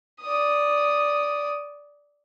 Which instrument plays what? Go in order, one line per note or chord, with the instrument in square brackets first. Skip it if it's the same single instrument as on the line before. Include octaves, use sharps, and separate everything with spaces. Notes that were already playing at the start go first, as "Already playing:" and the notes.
[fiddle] D5 D#6